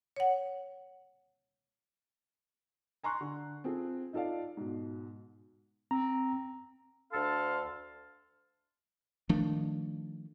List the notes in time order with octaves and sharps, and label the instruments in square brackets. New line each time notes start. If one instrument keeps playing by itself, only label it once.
[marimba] C#5 F#5
[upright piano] G#5 A#5 C6 C#6 F#6
D3
C4 F4 G#4 A4
D#4 F4 A4 D5 F5
G#2 B2
[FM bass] C4 [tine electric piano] A#5
[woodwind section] D2 D4 A4 F5 A5 C6
[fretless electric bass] D#3 F3 A3 D4